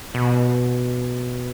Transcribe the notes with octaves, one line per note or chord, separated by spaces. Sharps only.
B2